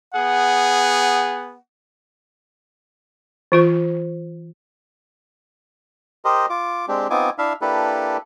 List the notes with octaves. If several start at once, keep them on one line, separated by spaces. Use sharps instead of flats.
B3 G#4 F#5
E3 F4 C5
G4 A#4 C5 D#5
F4 D6
G#3 C4 D4 G4
B3 C4 D#4 F4 G#5 D6
D4 E4 E5 F5
A#3 D4 E4 G4 A4 B4